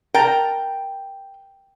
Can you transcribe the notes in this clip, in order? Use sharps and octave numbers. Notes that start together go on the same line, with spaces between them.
A#4 G5 A5 A#5